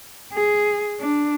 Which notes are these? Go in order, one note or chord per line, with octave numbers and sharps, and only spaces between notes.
G#4
D4